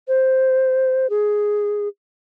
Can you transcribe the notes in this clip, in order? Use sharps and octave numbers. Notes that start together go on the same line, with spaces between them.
C5
G#4